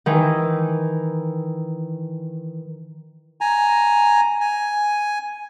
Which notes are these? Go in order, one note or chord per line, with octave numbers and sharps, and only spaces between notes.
D#3 E3
G#5 A#5
G#5